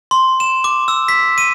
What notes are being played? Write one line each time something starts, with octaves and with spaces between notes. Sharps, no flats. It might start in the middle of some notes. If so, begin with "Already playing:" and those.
C6
E7
D6
E6
B6
D#7